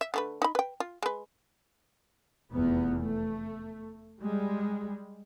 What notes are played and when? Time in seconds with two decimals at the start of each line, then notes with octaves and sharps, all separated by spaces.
0.01 E5
0.14 D3 A3 B4
0.42 D#4 B5
0.55 B4 G5
0.80 F4
1.03 G#3 B4
2.52 F1 E2 B3
3.02 A3
4.20 G3 G#3